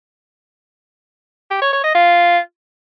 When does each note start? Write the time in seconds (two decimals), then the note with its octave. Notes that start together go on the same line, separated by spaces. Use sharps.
1.51 G4
1.62 C#5
1.73 C#5
1.84 D#5
1.95 F4